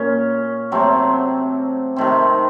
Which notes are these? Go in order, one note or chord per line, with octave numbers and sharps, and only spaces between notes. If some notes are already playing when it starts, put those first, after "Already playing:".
Already playing: A#2 C#4
C3 F#3 A3 C4
C3 D#3 A3 C4